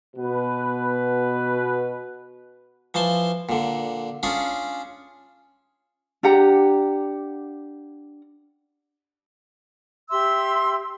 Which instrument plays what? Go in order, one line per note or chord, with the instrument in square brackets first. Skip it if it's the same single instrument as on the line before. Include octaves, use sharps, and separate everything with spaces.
[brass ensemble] B2 B4
[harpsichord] E3 F3 A5 C6
A#2 D3
C#4 D4 F4 G#4
[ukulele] D4 G4 F#5 A#5
[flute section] G4 E5 C6 E6